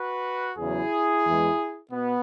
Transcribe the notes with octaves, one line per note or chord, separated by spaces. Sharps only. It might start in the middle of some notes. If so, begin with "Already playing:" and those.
Already playing: F#4 B4
E2 C#3 F#3 E4 G#4
E2 E3 G#3
B2 B3